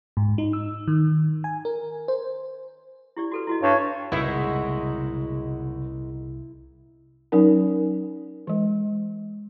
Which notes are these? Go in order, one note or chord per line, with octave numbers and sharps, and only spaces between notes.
G#2
D#4
E6
D#3
G#5
A#4
C5
E4 G4 D5
F#4 A4 B4
E4 F#4 D#5
G2 C#5
F#1 C2 A#2 G#3 D#4 E4 F#4
F#3 C#4 D#4 A#4
E3 G#3